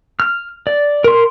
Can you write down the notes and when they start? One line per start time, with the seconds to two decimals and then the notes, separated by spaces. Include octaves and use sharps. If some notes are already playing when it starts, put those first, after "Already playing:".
0.20 F6
0.67 D5
1.04 A#4 C6